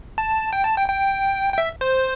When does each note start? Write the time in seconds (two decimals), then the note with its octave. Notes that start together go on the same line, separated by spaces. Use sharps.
0.18 A5
0.53 G5
0.64 A5
0.77 G5
0.88 G5
1.53 G5
1.58 E5
1.81 C5